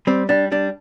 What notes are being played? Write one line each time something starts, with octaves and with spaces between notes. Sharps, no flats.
G3 C4
G3 D4
G3 D4